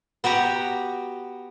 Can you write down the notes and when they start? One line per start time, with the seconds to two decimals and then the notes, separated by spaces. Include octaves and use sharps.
0.24 B3 F#4 G4 A#5